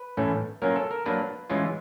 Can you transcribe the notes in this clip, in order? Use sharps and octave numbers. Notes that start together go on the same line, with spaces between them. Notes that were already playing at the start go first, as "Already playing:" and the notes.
Already playing: B4
A2 E3 A3 C#4
F#3 A#3 C#4 F4 A#4
A4
A#4
F#3 A#3 D4 B4
E3 G#3 C#4 F4